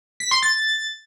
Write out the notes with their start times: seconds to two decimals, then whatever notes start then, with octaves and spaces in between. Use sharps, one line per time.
0.20 B6
0.31 C6
0.43 A6